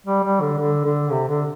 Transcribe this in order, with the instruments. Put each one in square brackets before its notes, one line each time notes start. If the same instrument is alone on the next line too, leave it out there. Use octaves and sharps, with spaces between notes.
[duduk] G3
G3
D3
D3
D3
C3
D3